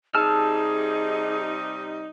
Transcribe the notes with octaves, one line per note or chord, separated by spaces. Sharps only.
C3 G3 D#4 G#4 A5 E6 F6